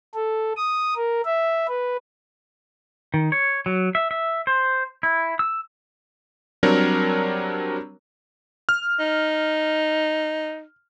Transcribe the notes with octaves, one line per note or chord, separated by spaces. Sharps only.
A4
D#6
A#4
E5
B4
D#3
C#5
F#3
E5
E5
C5
E4
E6
F#3 G3 C4 D4 A#4 C#5
F6
D#4